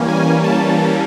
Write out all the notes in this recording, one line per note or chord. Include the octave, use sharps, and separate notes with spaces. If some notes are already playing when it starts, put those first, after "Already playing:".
Already playing: E3 G3 A#3 C#4
G#5
A5